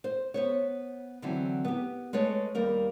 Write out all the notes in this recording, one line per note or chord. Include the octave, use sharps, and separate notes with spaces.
C5
B3 C5 C#5
D3 E3 F#3 C4
B3 G4
G#3 A3 B4 C#5
D#2 G3 A#3 A#4